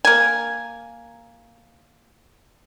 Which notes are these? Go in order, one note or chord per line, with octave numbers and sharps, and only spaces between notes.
A#3 G#5